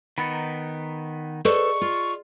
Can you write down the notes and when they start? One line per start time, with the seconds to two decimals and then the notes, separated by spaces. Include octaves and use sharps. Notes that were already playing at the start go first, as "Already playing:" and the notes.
0.18 D#3 B3 D#4 B5 A6 C#7
1.45 G#4 A4 B4 C5 D5 D#5 C#6
1.82 F4